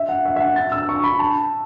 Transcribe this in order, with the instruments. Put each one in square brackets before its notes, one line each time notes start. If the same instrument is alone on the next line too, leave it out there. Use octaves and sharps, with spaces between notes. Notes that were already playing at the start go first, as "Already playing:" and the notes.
Already playing: [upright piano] E5
F#5
E5
E5
F#5
A6
E6
C#6
B5
A5